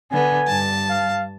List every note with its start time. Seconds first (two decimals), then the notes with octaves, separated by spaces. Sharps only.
0.12 D3 B3 G#5
0.48 G2 A5
0.90 F5